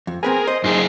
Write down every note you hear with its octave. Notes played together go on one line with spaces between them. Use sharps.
F2
C4 G#4 A#4 B4 G#5
C5 D#5
F#2 D#4 G#4 C6